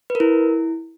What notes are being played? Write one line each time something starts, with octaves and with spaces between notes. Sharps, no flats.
B4
A#4
E4